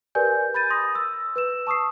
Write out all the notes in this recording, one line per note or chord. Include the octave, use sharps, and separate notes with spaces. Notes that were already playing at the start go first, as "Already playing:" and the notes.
G4 A#4 B4 D5 G#5 G6
B5 G6 A6 D#7
C6 D#6 A#6
E6
B4 E6 E7
A5 C#6 D#6 E6 C7